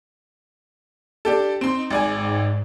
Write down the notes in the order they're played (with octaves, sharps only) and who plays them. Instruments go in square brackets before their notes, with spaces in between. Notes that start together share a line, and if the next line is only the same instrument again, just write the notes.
[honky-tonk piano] D4 G4 A4
[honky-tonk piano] C4 C6 [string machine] D#4
[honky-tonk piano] G#1 D5 G#5 [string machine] G#2